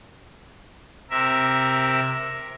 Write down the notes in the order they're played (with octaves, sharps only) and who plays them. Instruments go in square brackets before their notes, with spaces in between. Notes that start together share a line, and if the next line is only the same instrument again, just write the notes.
[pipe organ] C3 A#4 E5